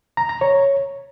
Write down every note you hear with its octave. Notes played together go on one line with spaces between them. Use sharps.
A#5
A#5
C#5